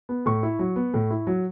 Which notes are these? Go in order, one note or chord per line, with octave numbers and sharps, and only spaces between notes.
B3
A2 C#6
E4
F#3
B3
A2
E4
F#3